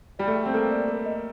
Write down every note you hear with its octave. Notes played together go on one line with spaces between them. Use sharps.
G3 D5
A3
G5
C4
A#3 A4
D5
A#4
D#5